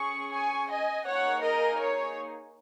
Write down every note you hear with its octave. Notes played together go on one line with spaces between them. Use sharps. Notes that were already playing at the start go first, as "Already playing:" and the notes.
Already playing: C#4 G#4 C#6
G#5 C#6
D#5 G#5
A#3 D#4 G#4 C#5 F#5
A#4 D#5
C#5